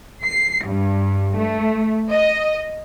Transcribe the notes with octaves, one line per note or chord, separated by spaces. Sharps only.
C7
G2
A3
D#5